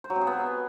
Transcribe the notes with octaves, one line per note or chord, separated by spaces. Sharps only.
C5
F#3
C4
G#4
B3